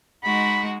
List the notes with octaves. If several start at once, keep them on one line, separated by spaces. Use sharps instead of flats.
G#3 D#4 F#4 B5